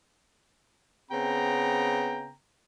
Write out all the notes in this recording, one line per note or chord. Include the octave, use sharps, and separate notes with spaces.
C#3 B3 C4 G5 A#5